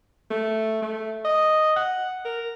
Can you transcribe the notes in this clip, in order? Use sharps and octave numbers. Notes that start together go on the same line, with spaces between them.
A3
A3
D#5
F#5
A#4